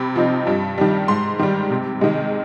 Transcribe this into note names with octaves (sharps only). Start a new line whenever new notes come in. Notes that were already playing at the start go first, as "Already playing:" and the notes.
Already playing: C3 B5
F3 C4 D#4
G2
D#3 G3
G#2 C6
D#3 G3
C3
D#3 G#3